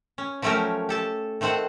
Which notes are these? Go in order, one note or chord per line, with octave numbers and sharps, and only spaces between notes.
C#4
F3 F#3 A3 C#4 G4 A#4
G4 A4 A5
D#3 A3 C4 C5 F#5